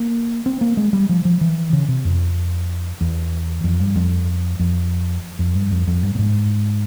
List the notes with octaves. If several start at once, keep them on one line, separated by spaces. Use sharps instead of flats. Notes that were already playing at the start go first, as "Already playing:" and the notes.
Already playing: A#3
C4
A#3
G#3
G3
F3
F3
E3
C#3
C3
F2
E2
F2
G2
F2
F2
F2
G2
F2
F2
G2
A#2
G#2